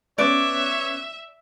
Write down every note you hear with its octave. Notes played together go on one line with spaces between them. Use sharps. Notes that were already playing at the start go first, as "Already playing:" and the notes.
B3 C#4 C#5 D5 E5 F#6